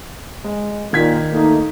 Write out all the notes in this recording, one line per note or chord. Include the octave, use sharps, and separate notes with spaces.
G#3
A#2 D#3 G#6 B6
A3 A#3 D#4